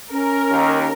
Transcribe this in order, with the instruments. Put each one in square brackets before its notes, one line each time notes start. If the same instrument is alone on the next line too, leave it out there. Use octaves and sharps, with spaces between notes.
[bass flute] C#4 [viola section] A#4
[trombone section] D#2